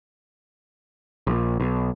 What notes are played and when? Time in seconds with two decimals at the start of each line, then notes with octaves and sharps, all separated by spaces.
1.27 A#1
1.60 B1